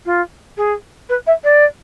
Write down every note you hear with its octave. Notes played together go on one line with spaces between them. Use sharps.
F4
G#4
B4
E5
D5